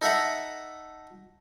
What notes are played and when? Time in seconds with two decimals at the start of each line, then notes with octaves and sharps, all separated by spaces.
0.02 D#4 A4 E5 F#5 A#5